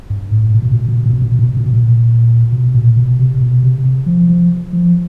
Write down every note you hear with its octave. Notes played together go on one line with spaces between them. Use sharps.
G2
A2
A#2
B2
A#2
B2
A#2
B2
A#2
B2
A#2
B2
A#2
B2
A#2
B2
A#2
B2
A#2
B2
C3
B2
C3
C3
F3
F3
F3